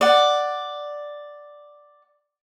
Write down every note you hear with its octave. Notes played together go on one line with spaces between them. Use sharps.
D5 F#5